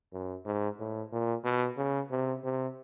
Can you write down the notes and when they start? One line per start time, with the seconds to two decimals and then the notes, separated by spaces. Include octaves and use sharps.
0.13 F#2
0.45 G#2
0.79 A2
1.12 A#2
1.44 B2
1.78 C#3
2.11 C3
2.44 C3